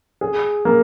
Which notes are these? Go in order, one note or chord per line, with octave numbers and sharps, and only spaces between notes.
G#4
A#3